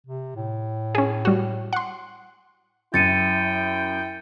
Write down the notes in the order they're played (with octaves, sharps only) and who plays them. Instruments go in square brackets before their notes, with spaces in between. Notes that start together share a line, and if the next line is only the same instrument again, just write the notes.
[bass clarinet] C3
A2
[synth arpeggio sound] C#4 G#4
G3 F#4
F#5 C6
[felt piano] F#2 [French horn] E4 [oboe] G5 [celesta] A6 C#7 D#7